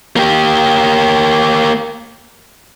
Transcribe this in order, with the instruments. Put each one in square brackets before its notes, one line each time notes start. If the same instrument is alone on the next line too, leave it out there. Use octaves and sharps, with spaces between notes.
[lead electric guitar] A#3 G4